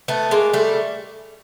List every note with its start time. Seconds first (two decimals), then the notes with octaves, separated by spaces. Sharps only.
0.08 A3 B3
0.31 G#3 A#3
0.53 G3 A3